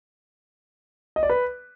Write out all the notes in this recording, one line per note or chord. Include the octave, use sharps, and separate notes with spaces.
D#5
D5
B4